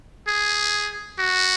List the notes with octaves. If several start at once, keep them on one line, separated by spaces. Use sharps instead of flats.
G#4
F#4